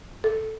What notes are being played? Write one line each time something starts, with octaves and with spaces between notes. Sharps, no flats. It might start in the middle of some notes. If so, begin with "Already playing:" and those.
A4